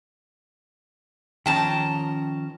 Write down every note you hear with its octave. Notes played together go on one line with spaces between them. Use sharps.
D#3 F3 C#4 G5 A5 A#5